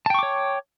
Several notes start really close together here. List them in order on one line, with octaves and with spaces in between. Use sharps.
A5 G5 C#6 D6 C#5